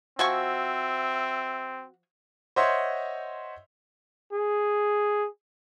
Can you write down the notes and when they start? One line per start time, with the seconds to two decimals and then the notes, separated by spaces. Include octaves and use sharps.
0.19 F3 C4 F#4 E5 G#5 C#6
2.56 C5 C#5 D#5 E5 F#5 C6
4.33 G#4